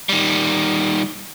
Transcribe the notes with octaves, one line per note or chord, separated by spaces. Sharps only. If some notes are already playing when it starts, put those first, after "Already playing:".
D#3 G3